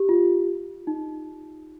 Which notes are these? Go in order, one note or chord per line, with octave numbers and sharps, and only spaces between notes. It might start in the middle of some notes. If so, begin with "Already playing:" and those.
Already playing: G4
F4
D#4